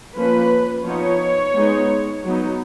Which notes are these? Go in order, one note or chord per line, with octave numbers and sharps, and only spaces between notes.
F3 A#3 C#4 B4
F3 B3 D#4 C#5
G#3 B3 D#4
F#3 B3 D#4